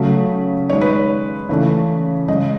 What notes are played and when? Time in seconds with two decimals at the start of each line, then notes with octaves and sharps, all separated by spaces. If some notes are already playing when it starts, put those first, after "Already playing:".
Already playing: C#3 F#3 A3
0.69 D#3 G#3 C#5
0.81 B4
0.93 C#5
1.49 C#3 E3 A3
2.28 C#3 G#3 D#5